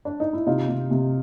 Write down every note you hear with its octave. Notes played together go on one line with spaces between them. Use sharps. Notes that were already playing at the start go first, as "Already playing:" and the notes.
D4
D#4
E4
C3 D#4 F4
C3
C3